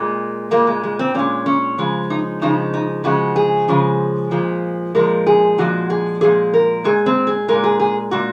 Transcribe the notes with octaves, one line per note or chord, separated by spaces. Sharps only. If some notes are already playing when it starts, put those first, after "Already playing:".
Already playing: A#2 G#3
A#2 G#3 A#3
G#3
G#3
C4
A#2 G#3 C#4
C#4
C#3 F3 G#3
D#4
C#3 F3 G#3 D#4
D#4
C#3 F3 G#3 F#4
G#4
C#3 F3 G#3
A#2 F3 G#3
A#2 F3 G#3 A#4
G#4
A#2 F3 G#3 F#4
G#4
A#2 F3 G#3 G#4
A#4
A#2 G#3 G#4
C4
G#4
A#2 G#3 A#4
G#4
G#4
A#2 G#3 F#4